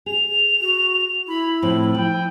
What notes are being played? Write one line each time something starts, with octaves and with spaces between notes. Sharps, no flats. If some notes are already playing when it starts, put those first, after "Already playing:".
G#4 F7
F#4
E4 B5
A2 F3 C4 F#7
F3 G5